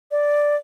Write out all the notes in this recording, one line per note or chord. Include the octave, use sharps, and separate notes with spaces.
D5